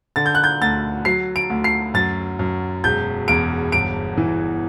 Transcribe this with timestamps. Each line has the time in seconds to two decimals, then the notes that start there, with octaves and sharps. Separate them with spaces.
0.16 D3 A6
0.26 G6
0.35 F#6
0.44 G6
0.61 D2 A6
1.05 F#3 C7
1.36 D7
1.50 D2
1.64 C7
1.94 F#2 A6
2.39 F#2
2.84 E1 G6
3.28 E2 D7
3.72 G1 D7
4.17 E3